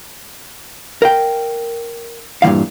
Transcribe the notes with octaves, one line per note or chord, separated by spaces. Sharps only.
A#4 F5 G5
G2 A#2 D#3 E3 F5